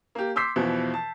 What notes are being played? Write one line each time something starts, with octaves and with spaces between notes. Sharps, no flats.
A#3 G4
C6 D6 E6 G6 B6 C7
E2 B2 E3 F3
A5